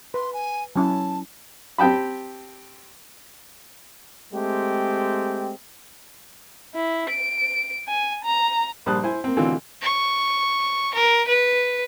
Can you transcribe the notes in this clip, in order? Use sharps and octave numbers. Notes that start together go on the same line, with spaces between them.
B4 C6
G#5
F#3 C#4 E4 A5
C4 G4 G5 A5 B5
G#3 A3 C4 G4
E4
D7
G#5
A#5
A#1 G3 C5 A5 D#6 F#6
E4 C5 G#5
A#3 C4
B2 D3 E3 A3 C4 F4
C#6
A#4
B4